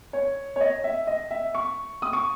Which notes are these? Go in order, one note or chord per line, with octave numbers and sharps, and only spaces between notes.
C#5
C#5
D#5
E5
D#5
E5
C#6
D#6
C#6